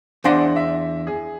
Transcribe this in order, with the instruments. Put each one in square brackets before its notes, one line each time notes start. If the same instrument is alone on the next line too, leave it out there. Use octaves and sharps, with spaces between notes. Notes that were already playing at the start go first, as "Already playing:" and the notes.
[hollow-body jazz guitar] E2 D4 C6 [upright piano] C5 F#5 A#6
[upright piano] E5
G#4